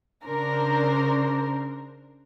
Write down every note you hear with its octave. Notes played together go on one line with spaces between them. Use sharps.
C#3 D4 A#4 C5